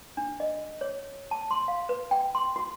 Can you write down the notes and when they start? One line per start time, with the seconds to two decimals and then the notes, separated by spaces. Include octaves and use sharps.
0.17 D4
0.40 D#5
0.81 C#5
1.31 A5
1.51 C6
1.68 F5
1.89 B4
2.11 G5
2.35 C6
2.56 F#4